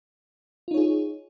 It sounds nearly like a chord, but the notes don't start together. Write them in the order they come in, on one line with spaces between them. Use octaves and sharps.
F4 D#4 C#5 G#4